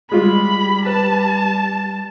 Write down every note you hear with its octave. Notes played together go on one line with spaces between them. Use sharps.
G3 G#3 F4 B5
B4 A5